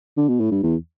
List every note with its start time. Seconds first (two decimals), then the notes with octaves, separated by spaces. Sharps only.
0.17 D3
0.29 B2
0.40 A2
0.51 G2
0.63 E2